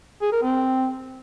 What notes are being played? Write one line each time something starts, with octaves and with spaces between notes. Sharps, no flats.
G#4
A#4
C4